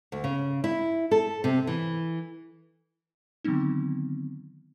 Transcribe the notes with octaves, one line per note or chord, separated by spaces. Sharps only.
D2
C#3
E4
A4
C3
E3
D3 D#3 F#3 B3 C4 D#4